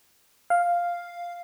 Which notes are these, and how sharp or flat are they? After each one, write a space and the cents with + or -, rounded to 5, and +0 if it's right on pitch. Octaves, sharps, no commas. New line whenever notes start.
F5 +0